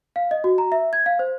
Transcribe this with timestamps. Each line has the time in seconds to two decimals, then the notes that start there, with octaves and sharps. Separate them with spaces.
0.16 F5
0.31 D#5
0.44 F#4
0.58 A#5
0.72 E5
0.93 G#6
1.06 F5
1.19 C5